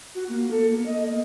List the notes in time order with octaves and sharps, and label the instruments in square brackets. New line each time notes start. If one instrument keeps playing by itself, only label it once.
[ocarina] F#4
A#3
A4
A#3
D#5
A#3